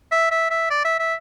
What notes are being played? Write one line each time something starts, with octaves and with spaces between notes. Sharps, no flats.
E5
E5
E5
D5
E5
E5